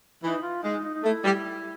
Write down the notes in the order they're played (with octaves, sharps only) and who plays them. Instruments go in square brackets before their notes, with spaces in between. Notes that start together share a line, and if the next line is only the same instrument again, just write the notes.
[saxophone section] E3 [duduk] D#4
[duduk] F4
[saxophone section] G#3 [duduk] D#4
[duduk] D#4
D#4
[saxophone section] A3 [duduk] E4
[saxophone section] G3